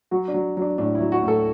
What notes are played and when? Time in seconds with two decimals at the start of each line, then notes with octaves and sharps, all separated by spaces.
0.11 F#3 F#4
0.28 D4
0.34 F#3
0.57 F#3 D4
0.78 A2 D4
0.95 E4
1.00 F#3
1.12 F#4
1.23 A2
1.28 A4